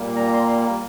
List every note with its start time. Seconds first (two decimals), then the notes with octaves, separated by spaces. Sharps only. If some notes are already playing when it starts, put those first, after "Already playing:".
Already playing: A#2 G3 A#3
0.16 A#5
0.34 C6